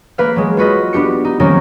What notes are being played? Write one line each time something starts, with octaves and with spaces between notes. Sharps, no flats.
A#3 B4 F5
F#3 G#3
F4 F#4 B4 D#5
B3 D4 G4 C#7
D#4
D#3 F#3 A#3 C4 C#4 D#4